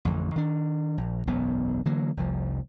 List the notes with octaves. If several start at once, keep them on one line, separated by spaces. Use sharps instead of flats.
A1 F2 D3
D#3 D4
A#1
E1 B1 F#2 B3
D3 E3 F#3 A#3
F1 C2 F3